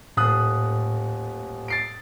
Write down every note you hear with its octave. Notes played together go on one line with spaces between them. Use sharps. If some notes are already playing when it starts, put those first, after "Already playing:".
D#1 A2 D#6 F#6
A6 C7 D7